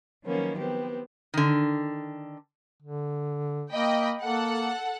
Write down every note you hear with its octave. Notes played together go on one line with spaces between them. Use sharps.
D#3 F3 F#3 A#3 B3 C#4
B3 C4 G4
D3 D#3
D3
A#3 D#5 G5 B5
A#3 A4 F#5